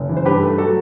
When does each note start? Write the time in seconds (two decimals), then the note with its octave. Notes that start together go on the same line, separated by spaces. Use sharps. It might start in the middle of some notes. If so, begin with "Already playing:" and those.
Already playing: F#1
0.09 E3
0.17 C5
0.25 G2 G4 B4
0.43 A3
0.58 F#3 F#4 A4